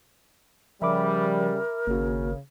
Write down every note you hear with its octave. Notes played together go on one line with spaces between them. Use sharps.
C#3 F3 G3 A#4 E5 B5 D6
G#1 C#3 A#3 F#4